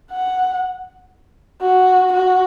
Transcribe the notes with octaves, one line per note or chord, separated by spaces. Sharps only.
F#5
F#4
F#4